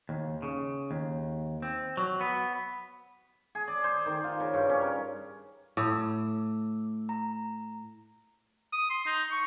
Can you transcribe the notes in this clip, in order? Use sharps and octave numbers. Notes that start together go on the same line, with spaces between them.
D#2
C#3
D#2
C4
F#3
B3
G#4
D5
C5
D#3
F4
C#3
G2
C#4
A#4
A2 D6 E6
A#5
D#6
C6
D#4
C#6